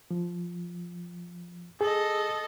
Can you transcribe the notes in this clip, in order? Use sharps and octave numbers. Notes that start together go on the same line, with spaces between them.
F3
G#4 A4 D#5